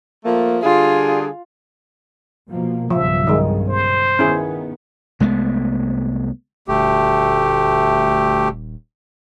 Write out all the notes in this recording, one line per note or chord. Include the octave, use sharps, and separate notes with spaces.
F3 A3 A#3
D3 G3 F4 G#4
B2 F3 A#3
B1 G2 C#3 F3 E5
D#3 G#3
C5
D#3 B3 C#4 E4 G#4
C2 G#3 A3 B3
D#1 D2 A3 G4